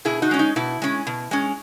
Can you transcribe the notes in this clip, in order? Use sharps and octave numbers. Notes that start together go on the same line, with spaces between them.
B2 E4 G#4
D#4 F#4
G#3 C#4
D#4
B2 E4
G#3 C#4
B2
G#3 C#4